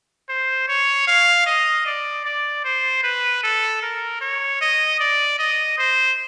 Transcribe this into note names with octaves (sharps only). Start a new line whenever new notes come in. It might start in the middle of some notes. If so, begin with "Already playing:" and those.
C5
C#5
F5
D#5
D5
D5
C5
B4
A4
A#4
C#5
D#5
D5
D#5
C5